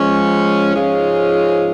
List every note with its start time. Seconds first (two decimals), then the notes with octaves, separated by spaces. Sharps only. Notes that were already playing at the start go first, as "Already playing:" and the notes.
Already playing: F3 G#3 C#4
0.75 G#2 F3 G#3 C#4 F4